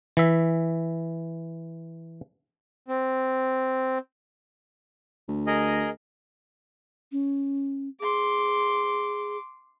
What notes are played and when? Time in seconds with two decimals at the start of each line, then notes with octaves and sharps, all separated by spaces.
0.17 E3 E5
2.88 C4
5.28 D2
5.47 G#4 A#4 D#5
7.12 C#4
8.01 G#4 C6 D6